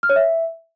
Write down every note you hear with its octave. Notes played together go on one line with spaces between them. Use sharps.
F6
C#5
E5